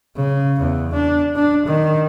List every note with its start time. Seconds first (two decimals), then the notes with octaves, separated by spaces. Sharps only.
0.16 C#3
0.60 E2
0.93 D4
1.36 D4
1.66 D#3